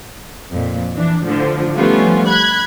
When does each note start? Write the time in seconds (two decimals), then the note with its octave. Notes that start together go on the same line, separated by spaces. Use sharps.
0.52 F2 A#2
0.93 E3 D4
1.25 A2 D3 F3
1.76 F3 G3 A3 B3 C#4 F4
2.26 B5 F#6 G#6